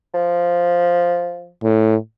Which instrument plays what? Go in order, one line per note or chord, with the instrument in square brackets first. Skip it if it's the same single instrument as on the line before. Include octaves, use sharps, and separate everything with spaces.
[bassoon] F3
[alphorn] A2